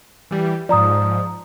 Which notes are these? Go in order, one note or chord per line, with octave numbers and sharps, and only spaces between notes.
E3 G3
G#2 F3 D5 A#5 D#6